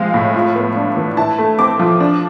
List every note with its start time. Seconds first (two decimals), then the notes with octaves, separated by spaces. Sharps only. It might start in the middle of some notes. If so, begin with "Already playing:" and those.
Already playing: F3 G#3 C4 F5
0.14 A2
0.34 F4
0.55 B3
0.76 D4
0.97 E3
1.17 E4 A5
1.38 A3
1.59 C4 D6
1.79 F3
2.00 D4